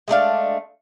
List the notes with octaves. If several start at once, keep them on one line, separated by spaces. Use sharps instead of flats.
G#3 A3 D4 F5